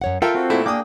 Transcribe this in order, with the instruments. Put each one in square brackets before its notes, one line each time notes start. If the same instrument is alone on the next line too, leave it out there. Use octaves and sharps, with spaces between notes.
[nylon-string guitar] F#2 C#5 F#5
[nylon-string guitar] F4 [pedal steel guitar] A4 [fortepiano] A#4 E5 G5
[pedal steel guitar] C4 [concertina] F#4 A4
[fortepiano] A#2 A3 E4
[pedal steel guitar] A#3 [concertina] D4 G#4 G5 [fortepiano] D6 D#6